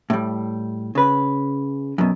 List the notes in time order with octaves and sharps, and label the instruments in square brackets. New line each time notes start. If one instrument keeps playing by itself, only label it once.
[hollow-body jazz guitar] A2 G3
C#3 B4
F#2 B2